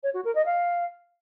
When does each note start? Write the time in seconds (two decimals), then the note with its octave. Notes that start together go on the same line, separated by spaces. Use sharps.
0.03 C#5
0.14 F#4
0.25 A#4
0.35 D#5
0.46 F5